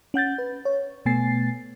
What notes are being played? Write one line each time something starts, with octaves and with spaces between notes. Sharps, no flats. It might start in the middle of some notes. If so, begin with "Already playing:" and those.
C#4 F#5 G6 A6
B4
C#5
B2 A3 B3 G#5 A6 C7